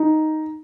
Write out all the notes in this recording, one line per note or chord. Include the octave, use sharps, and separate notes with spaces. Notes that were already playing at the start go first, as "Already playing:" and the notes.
Already playing: D#4